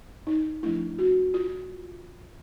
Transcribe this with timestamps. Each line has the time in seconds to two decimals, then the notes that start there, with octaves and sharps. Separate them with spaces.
0.27 D#4
0.63 F3 A3 D4 E4
0.99 F#4
1.34 F4